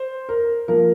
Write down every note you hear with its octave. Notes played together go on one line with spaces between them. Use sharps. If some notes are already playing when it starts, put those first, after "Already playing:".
Already playing: C5
A#4
F3 A#3 A#4